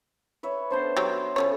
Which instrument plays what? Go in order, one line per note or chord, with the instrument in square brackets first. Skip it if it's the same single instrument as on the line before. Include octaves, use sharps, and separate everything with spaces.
[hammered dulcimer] B4 C#5 E5
[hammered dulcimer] B3 D4 A5 [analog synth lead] C5
[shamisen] F#3 G4 C#5
[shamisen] F3 G#4 C#5 [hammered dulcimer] C#4 A4